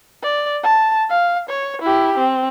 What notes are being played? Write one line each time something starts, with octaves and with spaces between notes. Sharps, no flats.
D5
A5
F5
C#5
E4 G4
C4